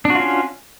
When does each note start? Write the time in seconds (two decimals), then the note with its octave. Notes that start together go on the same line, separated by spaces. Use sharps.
0.05 D4
0.10 F#4
0.15 F4
0.20 C#4